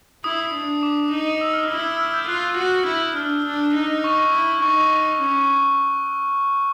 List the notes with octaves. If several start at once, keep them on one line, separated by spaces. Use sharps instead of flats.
E4 D#6
D4
D6
D#4
E6
F6
E4 E6
F6
G6
F4 F#6
F#4
E4
D4 F6
D4
D#4
C#6
E4
D#4 C#6
C#4